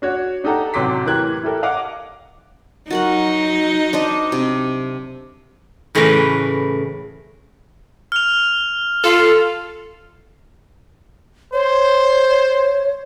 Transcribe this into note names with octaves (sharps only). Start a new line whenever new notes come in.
D4 F#4 C#5
D4 D#4 G4 A4 F#5 A#5
A1 C3 F#3 C6 D6 B6
A2 E3 G4 A#4 F#6 G#6
E4 G4 A4 A#4
D#5 F5 F#5 D6
F#3 D#4 F#4 A#4 F#5
D4 C5 D#5
C3
A2 C#3 E3 A3 A#4 B4
F6 F7
F4 A4
C5 C#5